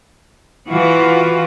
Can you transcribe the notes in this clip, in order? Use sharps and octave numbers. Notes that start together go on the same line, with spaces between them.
E3 F4 F#4